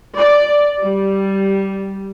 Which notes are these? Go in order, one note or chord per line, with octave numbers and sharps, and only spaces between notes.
D5
G3